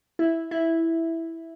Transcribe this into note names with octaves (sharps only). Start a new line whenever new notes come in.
E4
E4